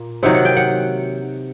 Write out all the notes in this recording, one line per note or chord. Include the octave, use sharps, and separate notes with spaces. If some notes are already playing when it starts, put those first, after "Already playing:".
Already playing: A#2 A#3
C3 D#3 F#3 F#5
F#5
G5
F#5